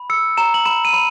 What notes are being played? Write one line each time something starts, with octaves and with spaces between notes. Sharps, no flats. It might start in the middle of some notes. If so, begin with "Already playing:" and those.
Already playing: B5
E6 C#7
A#5 E7
F#7
B5 E7
D#7
B5